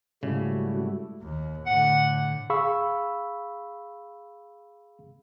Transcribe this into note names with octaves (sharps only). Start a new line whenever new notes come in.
G#2 C#3 G3 A3 E4 F#4
D#2
A2 D3 F#5
G#4 F5 B5 C#6 E6